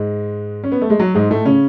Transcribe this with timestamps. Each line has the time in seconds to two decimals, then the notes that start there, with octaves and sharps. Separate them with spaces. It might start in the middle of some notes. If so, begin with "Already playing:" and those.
Already playing: G#2 G#3
0.64 C#4
0.72 B3
0.82 A3
0.90 G#3
1.00 F#3
1.15 G#2 G#3
1.30 A2 A3
1.45 C#3 C#4